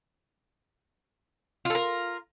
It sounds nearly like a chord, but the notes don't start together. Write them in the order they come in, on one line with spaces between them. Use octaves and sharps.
F4 A4 A#4